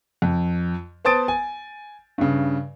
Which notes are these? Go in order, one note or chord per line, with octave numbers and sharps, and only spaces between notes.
F2
B3 C5 A5 D#6 A6 D7
G#5
G2 C#3